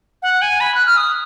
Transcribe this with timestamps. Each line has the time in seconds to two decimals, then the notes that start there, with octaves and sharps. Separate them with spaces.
0.23 F#5
0.42 G#5
0.60 B5
0.75 F#6
0.86 F6
0.97 D#6